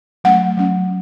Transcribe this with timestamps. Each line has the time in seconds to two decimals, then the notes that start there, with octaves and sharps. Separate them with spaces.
0.24 F#3 A3 C#4 F#5
0.57 F#3 C#4